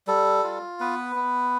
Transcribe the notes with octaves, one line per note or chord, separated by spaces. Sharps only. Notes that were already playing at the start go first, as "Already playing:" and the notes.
G3 A4
F4
B3 B4
B3